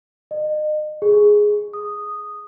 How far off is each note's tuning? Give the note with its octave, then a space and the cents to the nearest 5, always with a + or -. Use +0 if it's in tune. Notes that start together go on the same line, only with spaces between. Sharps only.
D#5 -35
G#4 +5
D#6 -5